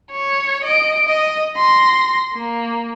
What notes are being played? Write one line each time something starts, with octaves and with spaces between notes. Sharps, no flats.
C#5
D#5 D7
D#5
C6 A#6
A#3